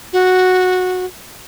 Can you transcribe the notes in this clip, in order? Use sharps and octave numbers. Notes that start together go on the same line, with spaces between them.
F#4